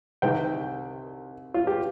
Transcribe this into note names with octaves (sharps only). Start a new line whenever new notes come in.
C2 C3 D#3 G3 G5
F4
G4